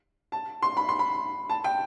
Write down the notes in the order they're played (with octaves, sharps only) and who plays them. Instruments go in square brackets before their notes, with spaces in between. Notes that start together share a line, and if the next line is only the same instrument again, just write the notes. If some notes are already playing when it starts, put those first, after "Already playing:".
[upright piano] A5
C6
B5
C6
B5
A5
G5